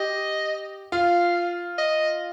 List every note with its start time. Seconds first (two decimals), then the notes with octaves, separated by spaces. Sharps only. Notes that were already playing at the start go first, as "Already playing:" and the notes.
Already playing: G4 D#5
0.92 F4 F5
1.78 D#5